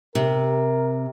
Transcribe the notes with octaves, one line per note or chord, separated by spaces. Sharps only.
C3 A#4